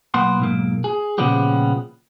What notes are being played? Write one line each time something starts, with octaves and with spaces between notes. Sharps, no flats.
B1 A#3 B3 F#5 C6
B1 G#2 A#3
G#4
A#2 C#3 F3 G3 B3 G4